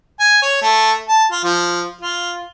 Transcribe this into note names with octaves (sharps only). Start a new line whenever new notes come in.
G#5
C#5
A3
A5
F4
F3
F4